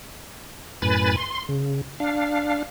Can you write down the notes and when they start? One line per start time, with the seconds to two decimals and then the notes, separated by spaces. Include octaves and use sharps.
0.82 F#2 A2 B4 G#5 B5 A6
1.17 C6
1.49 C#3
2.00 D4 F5